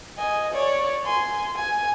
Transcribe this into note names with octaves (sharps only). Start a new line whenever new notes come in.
D#5 G#5
C#5 D5
G#5 C6
G#5